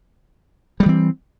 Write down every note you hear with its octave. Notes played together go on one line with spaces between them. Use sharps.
E3 G3 G#3 C4